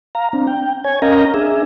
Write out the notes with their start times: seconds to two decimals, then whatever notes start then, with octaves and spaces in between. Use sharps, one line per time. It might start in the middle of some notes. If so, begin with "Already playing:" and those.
0.15 F5 A#5
0.33 C4 D4
0.47 G5
0.84 C#5 G#5 G#6
1.02 C#4 A#4 D#5 F5 G5 A#5
1.34 D4 G#4 E5